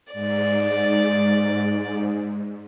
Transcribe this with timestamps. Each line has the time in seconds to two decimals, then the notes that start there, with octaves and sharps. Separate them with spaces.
0.13 G#2 D5